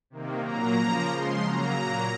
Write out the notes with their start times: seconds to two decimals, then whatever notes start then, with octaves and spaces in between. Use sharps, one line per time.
0.10 C3 D#3 A#3
0.43 A#2 F#3 A#3 A#5
0.76 C#3 F3 A#3
1.09 C#3 F3 G#3 C6
1.42 C#3 F#3 A#3 A#5
1.75 A#2 F#3 A#3